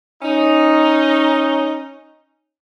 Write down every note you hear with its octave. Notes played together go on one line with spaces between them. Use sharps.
C#4 D#4